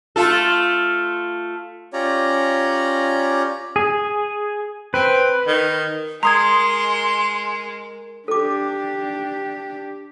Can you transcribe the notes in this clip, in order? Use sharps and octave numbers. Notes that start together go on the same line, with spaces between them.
A3 F4 A4
C#4 F4 G4 C#5 D5 A#5
G#4
C4 B4
D#3
G#3 A#4 A#5 C6 D#6 G#6
D4 G4 A4 D6